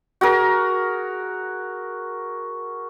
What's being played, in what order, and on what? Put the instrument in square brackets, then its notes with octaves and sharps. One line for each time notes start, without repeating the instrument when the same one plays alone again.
[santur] F#4 G#4 A#4